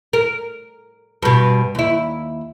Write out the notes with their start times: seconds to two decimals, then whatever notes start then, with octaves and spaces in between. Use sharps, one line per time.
0.13 A#4
1.22 G2 B2
1.75 D#2 E4